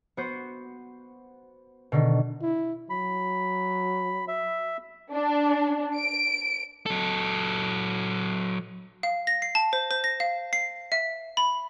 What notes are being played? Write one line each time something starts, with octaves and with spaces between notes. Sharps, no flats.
B3 F#4 C5
B2 D3 D#3
E4
F#3 B5
E5
D4
D7
F#3 A4
F5
A#6
C7
A5
C5
C5
A#6
F5
C7
E5
B5